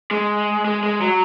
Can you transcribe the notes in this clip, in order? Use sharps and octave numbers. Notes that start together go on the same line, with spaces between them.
G#3
G#3
G#3
F#3